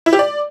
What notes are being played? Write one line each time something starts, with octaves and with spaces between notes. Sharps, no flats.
E4
G4
D5